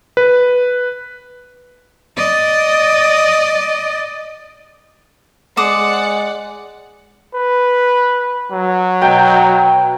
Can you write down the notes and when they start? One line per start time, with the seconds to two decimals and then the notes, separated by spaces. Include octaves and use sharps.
0.17 B4
2.17 D5 D#5
5.57 G#3 C5 D5 F#5 D6 D#6
7.35 B4
8.51 F#3
9.01 B2 G5 A#5